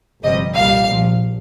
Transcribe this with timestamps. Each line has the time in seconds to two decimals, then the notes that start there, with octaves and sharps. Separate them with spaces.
0.23 G1 F2 C3 G3 D#5
0.57 C2 A#2 G3 F5
0.89 A#1 A#2 F3